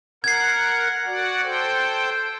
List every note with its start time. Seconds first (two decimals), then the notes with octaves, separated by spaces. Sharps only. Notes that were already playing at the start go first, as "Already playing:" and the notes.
0.24 A#4 F#5 G#6 C7
1.06 F#4 D5 F#5
1.43 A4 C5 G5